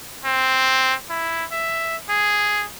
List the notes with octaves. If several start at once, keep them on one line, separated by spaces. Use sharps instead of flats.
C4
E4
E5
G#4